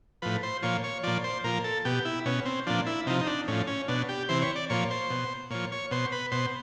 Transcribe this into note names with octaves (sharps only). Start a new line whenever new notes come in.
A2 F3 B4
C5
A#2 F3 C#5
C#5
A#2 F3 D5
C5
A#2 F3 A#4
A4
B2 G4
E4
B2 C#4
C4
A#2 F3 D4
E4
C3 F3 D#4
D#4
D4
A2 F3 C#4
C#4
B2 D4
G4
C3 E3 C5
C#5
D5
A#2 F3 C#5
C5
B2
A#2 F3 C#5
C#5
B2 C5
B4
B2 C5